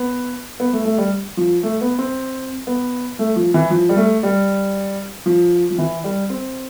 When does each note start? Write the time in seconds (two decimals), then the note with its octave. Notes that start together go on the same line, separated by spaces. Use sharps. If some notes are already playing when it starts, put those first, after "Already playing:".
Already playing: B3
0.60 B3
0.73 A3
0.85 A3
0.98 G3
1.37 F3
1.63 A3
1.81 B3
1.99 C4
2.67 B3
3.19 A3
3.36 F3
3.54 E3
3.70 F3
3.89 G3
3.97 A3
4.23 G3
5.26 F3
5.71 F3
5.78 E3
6.04 G3
6.30 C4